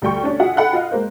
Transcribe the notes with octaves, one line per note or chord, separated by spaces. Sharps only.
D2 G3 G5 C#6
C#4 D4
F4 F#4 G#4 E5 F#5
A4 F#5 G5 B5 F#6
F4 D#5 F5
G#3 A#3 C5